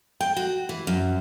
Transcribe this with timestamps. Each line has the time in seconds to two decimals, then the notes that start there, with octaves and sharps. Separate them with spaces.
0.21 G5
0.37 F#4
0.69 E3
0.87 F#2